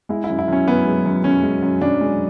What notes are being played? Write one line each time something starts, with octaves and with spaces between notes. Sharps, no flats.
G#3 E4
E4
F#2
E4
F#2 C#4
F#2 B3
G#3
F#2
F#2 C#4
G#3
F#2
F#2 D4
G#3